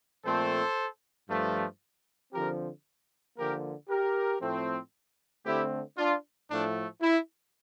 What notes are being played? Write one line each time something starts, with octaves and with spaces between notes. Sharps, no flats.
A#2 F3 A3 C4 A4 C5
G2 F3 A3
D3 F3 C4 G4 A#4
D3 F3 A#3 G4 A#4
G4 A#4
A2 F3 A3 C4
D3 A3 C4 E4 G4
D4 F4
A2 F3 A3 D4
E4